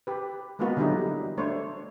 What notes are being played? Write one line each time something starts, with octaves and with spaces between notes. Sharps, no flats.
G4 B4
G#3 A#3 B3 F4 F#4 B4
D3 E3 F#3 G3 D#4 E4
A3 D4 C5 C#5